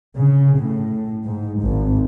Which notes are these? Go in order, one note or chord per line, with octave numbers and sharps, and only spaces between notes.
C#3
A2
G#2
G#1